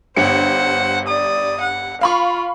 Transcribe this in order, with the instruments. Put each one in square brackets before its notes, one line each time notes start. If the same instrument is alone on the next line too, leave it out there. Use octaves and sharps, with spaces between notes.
[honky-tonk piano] G1 G2 C#7 [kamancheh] C5 F#5
[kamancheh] D5 D#6
F#5
[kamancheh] F4 [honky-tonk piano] F5 B5 C#6